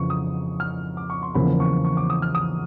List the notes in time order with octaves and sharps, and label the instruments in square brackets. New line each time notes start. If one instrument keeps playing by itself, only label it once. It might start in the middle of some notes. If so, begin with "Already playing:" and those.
Already playing: [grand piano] F2 C#3 E3 C#6
D#6
F6
D6
C#6
C6
E2 C#3 F3 A#3 B5
C#6
C#6
D6
D#6
F6
D#6